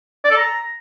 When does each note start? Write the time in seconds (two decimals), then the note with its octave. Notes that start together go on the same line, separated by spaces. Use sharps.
0.24 D5
0.31 A4
0.37 A#5